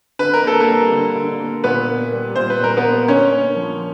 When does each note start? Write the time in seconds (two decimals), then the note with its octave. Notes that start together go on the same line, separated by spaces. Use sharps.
0.19 D3 B4
0.34 A#4
0.44 A#3 A4
0.60 A#3 A#4
0.68 G3
0.91 D3
1.15 D3
1.40 A#3
1.64 A#2 B3 B4
1.88 A#3
2.12 G3
2.36 A#2 C5
2.50 B4
2.60 A#2 A#4
2.77 B3 B4
2.84 A#3
3.08 D3 C#4 C#5
3.32 A#3
3.56 F3